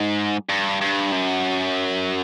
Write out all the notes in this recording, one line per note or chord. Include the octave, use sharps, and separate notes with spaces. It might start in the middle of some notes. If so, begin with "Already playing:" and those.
Already playing: G#2
G2
G2
F#2